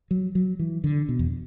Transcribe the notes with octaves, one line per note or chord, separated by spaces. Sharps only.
F#3
F#3
E3
D3
B2
E2